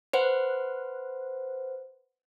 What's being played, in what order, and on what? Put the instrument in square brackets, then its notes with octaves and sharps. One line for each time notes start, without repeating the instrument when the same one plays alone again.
[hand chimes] B4 C5 F#5